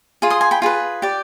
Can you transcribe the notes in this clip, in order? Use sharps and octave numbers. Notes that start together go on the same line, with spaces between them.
F4 G#4
C6 D#6
G#5 C6
G5 B5
F4 G#4 B4
G4 D5